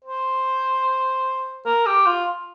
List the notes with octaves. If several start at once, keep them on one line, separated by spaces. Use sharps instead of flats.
C5
A#4
G4
F4